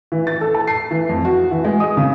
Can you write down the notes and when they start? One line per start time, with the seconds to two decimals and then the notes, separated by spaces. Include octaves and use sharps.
0.12 E3
0.27 A6
0.41 A4
0.54 A5
0.67 C7
0.91 E3
1.09 F2
1.25 F#4
1.51 E3
1.65 G#3
1.80 D#6
1.97 C#3